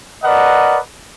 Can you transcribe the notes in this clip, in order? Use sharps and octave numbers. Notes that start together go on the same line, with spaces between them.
A#4 B4 D5 D#5 F#5